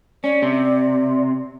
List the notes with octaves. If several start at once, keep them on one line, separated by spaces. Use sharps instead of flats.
C#4 D5
C3